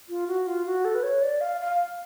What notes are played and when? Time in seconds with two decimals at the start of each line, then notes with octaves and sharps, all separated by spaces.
0.09 F4
0.27 F#4
0.47 F4
0.66 F#4
0.85 A4
0.95 B4
1.03 C#5
1.22 D5
1.41 F5
1.61 F5